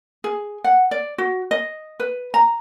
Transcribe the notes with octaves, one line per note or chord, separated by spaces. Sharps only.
G#4
F#5
D5
F#4
D#5
B4
A#5